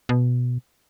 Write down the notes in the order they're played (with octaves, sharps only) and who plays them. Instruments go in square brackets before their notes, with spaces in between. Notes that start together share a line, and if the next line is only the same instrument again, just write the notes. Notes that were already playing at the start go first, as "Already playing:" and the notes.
[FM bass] B2